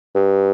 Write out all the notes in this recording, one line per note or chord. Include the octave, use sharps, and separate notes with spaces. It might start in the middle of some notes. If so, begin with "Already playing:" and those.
G2